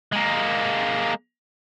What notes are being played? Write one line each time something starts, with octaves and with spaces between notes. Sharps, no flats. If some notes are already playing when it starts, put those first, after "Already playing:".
G#3 A#3